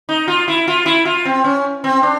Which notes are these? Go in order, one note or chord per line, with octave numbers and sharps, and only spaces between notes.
D#4
F4
E4
F4
E4
F4
C4
C#4
C4
D4